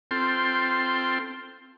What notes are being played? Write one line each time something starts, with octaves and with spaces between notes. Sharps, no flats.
C4 F4 A4 G5 C6